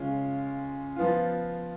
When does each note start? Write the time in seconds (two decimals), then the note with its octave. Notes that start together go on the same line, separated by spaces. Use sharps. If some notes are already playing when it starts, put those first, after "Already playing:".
Already playing: C#3 G#3 C#4 F4
0.96 F3 B3 F4